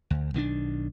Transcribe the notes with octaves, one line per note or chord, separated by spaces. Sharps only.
D2
B1 D#3 E3 D4